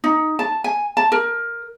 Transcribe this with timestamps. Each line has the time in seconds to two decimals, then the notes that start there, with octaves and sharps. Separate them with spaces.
0.04 D#4
0.39 A5
0.64 G#5
0.97 A5
1.12 A#4